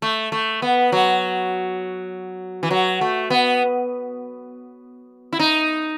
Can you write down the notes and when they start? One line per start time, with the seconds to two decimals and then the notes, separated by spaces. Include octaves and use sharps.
0.02 A3
0.32 A3
0.62 B3
0.92 F#3
2.63 E3
2.71 F#3
3.01 A3
3.30 B3
5.33 E4
5.39 D#4